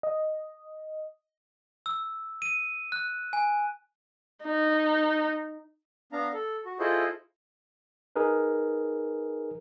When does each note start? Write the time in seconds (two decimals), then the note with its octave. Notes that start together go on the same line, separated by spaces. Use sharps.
0.03 D#5
1.86 E6
2.42 D#7
2.92 F#6
3.33 G#5
4.44 D#4
6.13 B3 D4 F5 A#5
6.33 A4
6.66 F#4
6.79 E4 F4 G#4 A4 C5 D#5
8.16 D#4 G#4 A#4 B4